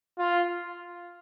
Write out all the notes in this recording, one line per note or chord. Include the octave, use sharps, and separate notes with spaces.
F4